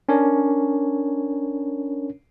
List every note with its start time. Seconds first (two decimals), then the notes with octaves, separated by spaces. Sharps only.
0.09 C#4 D4 A#4 C#5